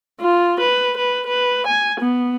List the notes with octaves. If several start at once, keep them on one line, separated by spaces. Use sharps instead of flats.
F4
B4
B4
B4
G#5
B3